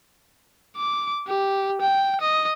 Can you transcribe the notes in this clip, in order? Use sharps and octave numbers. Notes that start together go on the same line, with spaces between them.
D6
G4
G5
D#5